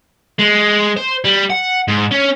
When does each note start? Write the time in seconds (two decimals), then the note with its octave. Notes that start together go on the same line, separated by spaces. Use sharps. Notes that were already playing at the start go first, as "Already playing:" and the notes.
0.39 G#3
0.97 C5
1.24 G3
1.50 F#5
1.88 G#2
2.12 C#4